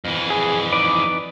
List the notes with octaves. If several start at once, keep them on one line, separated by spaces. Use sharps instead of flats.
F2 E3
G#4
D#4 B4 D5